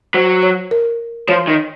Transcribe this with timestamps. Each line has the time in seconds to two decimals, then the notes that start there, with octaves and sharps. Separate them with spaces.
0.14 F#3 C5
0.43 C#5
0.71 A#4
1.28 F3 C#5
1.47 D#3